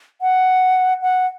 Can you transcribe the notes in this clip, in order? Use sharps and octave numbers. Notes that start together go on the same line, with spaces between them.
F#5
F#5